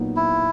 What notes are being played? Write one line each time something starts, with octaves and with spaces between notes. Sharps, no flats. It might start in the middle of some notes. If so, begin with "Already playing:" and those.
Already playing: A#2 F#3 B3 D#4
E4